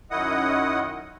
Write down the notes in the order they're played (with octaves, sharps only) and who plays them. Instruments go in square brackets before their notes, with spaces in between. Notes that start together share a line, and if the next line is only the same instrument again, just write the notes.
[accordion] F#2 D#3 E4 D#5 F#5 D#6